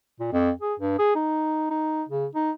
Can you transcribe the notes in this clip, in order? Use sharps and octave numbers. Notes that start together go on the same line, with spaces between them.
A#2
F2
G#4
G2
G#4
D#4
D#4
C#3
D#4